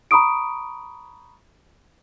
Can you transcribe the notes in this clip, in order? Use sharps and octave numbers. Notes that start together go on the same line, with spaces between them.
A#5 B5 C#6 D#6 D7